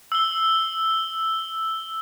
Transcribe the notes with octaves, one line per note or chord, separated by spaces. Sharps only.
E6 G7